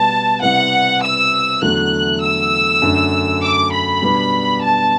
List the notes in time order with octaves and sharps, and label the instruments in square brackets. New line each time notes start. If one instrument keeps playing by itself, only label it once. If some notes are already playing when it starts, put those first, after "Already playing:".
Already playing: [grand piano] B2 G3 B3 [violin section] A5
[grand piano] C3 G3 B3 E4 [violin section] F#5
[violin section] E6
[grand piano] E2 D3 F#3 A3 [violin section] F#6
[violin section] E6
[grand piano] F#2 D3 A3 D4
[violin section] D6
B5
[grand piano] B2 G3 B3 D4
[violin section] A5